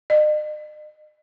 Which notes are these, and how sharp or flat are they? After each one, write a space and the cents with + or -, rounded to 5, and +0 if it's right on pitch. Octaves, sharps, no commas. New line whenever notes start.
D#5 -45